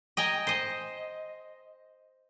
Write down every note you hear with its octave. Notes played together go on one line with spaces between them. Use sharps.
D#5 G5 G#5 A#5
C5 D#5